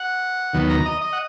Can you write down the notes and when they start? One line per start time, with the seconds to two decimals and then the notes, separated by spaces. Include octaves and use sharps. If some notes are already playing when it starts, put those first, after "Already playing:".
Already playing: F#5
0.54 D#2 D#3 F#3 B3
0.70 A#5
0.86 D#5
1.02 D#5
1.13 F#5